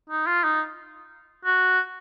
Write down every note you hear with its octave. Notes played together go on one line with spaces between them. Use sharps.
D#4
F4
D#4
F#4